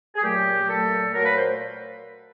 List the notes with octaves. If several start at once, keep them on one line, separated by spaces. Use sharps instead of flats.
G#4
A#2 F#3 A3 G4
A#2 F#3 A3 A4
A#2 F#3 A3 A#4
B4
C5